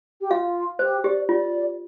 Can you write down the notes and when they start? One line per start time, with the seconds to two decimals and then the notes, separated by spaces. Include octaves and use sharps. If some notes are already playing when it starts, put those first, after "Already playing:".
0.21 G4
0.30 F4 F5
0.79 G4 C5
1.04 G4 D5
1.29 F4 D5